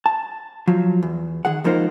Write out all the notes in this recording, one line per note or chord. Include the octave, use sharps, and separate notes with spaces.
A5
F3 F#3
E2
D#3 G#4 F#5
C#2 F3 A#3 D#4 A#4 C5